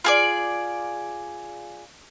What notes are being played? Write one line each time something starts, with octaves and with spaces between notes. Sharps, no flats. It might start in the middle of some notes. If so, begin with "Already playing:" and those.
F4 G#4 D5